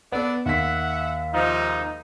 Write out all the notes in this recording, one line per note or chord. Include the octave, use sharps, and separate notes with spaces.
B3 D4 A4 D5
D#2 E5 F#5 B6
G#2 C3 F3 D#4